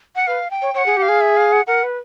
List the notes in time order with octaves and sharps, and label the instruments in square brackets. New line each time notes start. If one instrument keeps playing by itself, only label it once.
[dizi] F#5
[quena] B4 [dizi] F5
[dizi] G5
[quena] C#5
[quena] C#5 [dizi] G5
[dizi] F#5
[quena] G#4
[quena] G4 [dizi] F#5
[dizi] F5
[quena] G#4
[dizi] E5
F5
F#5
[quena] A#4 [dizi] F#5
[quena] B4